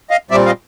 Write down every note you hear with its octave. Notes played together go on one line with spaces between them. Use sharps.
D#5 F5
A#2 G3 C4 D5 E5
D#5 F5